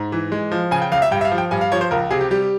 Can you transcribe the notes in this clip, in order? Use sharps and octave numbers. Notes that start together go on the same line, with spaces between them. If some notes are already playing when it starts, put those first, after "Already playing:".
Already playing: G#2
E3
G#3
F3
C#3 G#5
G5
C#2 F5
E5
G2 G5
E5
F5
F3
G5
G2 G#5
F5
F3 C#5
C5
C#2 A#4
C3 G#4
G4
G3 G4